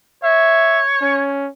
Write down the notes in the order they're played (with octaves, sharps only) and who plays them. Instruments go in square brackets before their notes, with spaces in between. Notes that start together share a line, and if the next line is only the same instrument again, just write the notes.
[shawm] C#5 [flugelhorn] E5
[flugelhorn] C#4